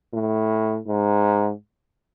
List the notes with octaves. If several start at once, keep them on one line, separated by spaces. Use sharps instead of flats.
A2
G#2